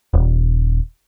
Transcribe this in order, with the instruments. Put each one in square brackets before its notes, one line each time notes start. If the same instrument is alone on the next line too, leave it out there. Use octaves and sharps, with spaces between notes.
[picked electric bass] D#1